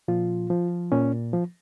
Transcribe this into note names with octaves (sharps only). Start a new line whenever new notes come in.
A#2 F3 F4
F3
A#2 C#4
F3